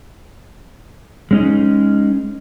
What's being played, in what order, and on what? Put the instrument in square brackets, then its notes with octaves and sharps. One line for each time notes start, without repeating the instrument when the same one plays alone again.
[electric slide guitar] G#3 C#4 D#4